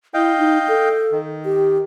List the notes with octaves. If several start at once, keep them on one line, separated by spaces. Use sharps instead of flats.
E4 D#5 F5 G5
D#4
A4
D#3
G4